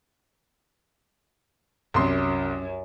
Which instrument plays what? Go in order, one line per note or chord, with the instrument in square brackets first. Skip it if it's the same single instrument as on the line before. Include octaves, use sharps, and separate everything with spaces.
[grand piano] C2 C6 [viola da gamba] F#2